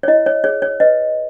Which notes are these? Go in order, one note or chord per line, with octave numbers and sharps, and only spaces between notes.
C#5
E4 D#5
C#5
G#4 C#5
C#5
B4 D#5